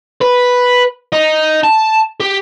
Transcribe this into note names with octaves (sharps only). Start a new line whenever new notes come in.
B4
D#4
A5
G4